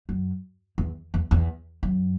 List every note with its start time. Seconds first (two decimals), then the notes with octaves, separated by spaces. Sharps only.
0.09 F#2
0.78 E2
1.14 E2
1.31 E2
1.83 F#2